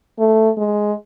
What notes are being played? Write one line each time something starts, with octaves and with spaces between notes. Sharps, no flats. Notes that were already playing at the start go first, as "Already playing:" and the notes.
A3
G#3